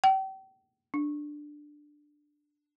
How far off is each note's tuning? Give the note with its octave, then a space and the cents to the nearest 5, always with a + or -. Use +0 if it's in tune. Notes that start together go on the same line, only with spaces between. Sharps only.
G5 -35
D4 +10